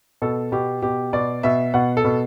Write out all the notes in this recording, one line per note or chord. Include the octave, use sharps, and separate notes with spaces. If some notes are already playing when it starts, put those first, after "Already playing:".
B2 A4
B2 G4
B2 G4
B2 D5
B2 E5
B2 F#5
A4
B2